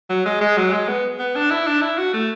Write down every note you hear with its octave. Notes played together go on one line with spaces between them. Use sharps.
F#3
G#3
G#3
F#3
G#3
B3
B3
D4
E4
D4
E4
F#4
A3